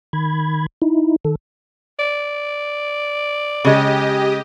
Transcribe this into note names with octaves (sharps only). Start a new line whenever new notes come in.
D#3 B5 G#6
D#4 E4
D#3 A4
D5
C#3 G#3 G4 D#5